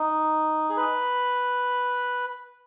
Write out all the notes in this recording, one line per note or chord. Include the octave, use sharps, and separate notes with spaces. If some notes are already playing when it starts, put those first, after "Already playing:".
Already playing: D#4
G#4
B4